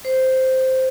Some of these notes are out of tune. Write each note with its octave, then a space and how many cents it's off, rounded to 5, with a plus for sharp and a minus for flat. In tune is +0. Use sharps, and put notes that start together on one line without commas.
C5 -5